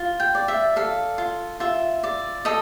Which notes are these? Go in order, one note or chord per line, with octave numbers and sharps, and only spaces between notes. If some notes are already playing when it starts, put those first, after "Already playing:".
Already playing: F4
G5
D5
E5
A4 F5
F4
F4 E5
D5
A4 D#5